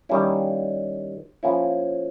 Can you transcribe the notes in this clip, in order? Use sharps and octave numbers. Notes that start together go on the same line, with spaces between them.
D#3 G3 A#3 C#4 E4
F3 A#3 C#4 E4